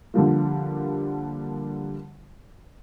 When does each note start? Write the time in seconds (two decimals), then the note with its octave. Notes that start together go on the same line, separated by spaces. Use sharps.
0.14 D3 F3 G3 A#3